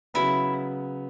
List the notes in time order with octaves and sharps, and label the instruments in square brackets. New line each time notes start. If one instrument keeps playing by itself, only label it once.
[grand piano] C#3 F#3 B3 [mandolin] E4